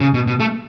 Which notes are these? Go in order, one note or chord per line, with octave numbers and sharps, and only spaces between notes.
C#3
B2
B2
A3